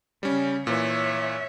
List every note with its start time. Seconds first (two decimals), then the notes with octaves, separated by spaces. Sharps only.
0.23 C#3 G3 C#4
0.67 A#2 E3 C#5 E5